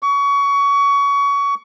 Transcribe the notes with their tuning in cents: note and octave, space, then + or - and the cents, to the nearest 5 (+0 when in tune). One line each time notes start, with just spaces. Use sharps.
C#6 +25